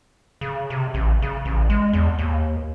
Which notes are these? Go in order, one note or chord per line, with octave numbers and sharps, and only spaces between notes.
C#3
C3
A1
C#3
A1
G#3
E2
D#2